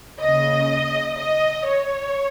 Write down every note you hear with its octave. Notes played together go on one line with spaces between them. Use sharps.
D#2 C#3 D#5
D#5
C#5